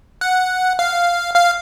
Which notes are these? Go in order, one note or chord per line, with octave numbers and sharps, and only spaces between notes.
F#5
F5
F5